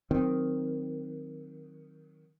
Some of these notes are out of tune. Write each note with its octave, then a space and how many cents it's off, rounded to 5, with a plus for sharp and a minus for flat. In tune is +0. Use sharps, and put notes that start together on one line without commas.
D#3 +0 F#3 +0 C4 +0